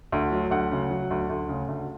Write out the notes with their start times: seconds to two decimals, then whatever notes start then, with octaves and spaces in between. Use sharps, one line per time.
0.12 D2
0.32 F#3
0.51 D2 F#5
0.72 C#3
0.91 F#3
1.11 D2
1.29 D2
1.49 C#3
1.68 D2